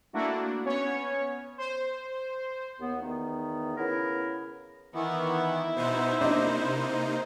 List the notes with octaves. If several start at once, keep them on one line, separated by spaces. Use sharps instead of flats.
A3 A#3 D4 E4 F#4
B3 C#4 C#5
C5
D#2 B3
E2 D#3 B3
C#3 B3 E4 A#4
D#3 E3 B3 E4
B2 B3 D#4 C5
C3 A#3 D4 D#4 D#5